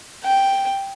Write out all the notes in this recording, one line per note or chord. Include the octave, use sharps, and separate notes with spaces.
G5